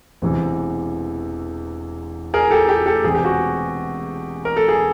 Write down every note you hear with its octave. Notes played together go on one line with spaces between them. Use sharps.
E1 E2 C3 E3
G#4 A#4
G4 A4
G4 A4
G4 A4
E1 E2 C3 G#4
G4
F#4 G#4
A#4
A4
G#4